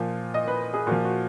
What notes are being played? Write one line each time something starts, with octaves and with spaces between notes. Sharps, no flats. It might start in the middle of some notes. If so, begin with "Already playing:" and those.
Already playing: A#2 F3
D#5
B4
G#4
A#2 F3 F#4
F#4